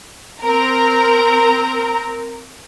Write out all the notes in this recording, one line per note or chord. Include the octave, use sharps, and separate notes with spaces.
C4 A#4 A#5